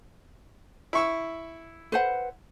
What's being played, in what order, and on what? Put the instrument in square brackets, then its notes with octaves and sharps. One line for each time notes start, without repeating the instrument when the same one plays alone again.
[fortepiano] E4 C#6 E6
[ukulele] B4 C5 F#5